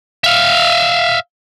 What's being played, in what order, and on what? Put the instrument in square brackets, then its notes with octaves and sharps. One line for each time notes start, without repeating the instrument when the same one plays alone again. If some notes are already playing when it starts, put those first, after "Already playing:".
[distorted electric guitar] E5 F5